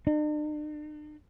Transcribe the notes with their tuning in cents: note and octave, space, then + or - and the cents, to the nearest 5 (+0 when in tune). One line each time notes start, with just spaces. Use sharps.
D4 +45